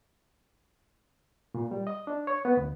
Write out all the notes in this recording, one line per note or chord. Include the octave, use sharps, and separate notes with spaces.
A#2
G3
D#5
D4
C#5
B3
D2